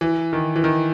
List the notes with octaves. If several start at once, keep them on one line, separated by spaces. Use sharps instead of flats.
E3
D#3
E3
D#3